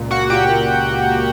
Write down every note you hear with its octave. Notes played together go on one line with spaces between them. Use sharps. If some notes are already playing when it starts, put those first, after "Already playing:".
Already playing: C#2 A#2
A#3 F#4 F#5
A#2 G4 G5
A#2